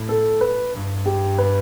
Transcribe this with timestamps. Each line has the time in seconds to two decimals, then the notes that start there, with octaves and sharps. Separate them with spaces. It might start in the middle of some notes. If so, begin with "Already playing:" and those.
Already playing: A2
0.09 A4
0.41 B4
0.73 G2
1.06 G4
1.38 B4